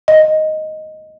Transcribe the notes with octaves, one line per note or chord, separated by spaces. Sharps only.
D#5